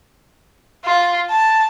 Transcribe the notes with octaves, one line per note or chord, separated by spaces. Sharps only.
F4
A5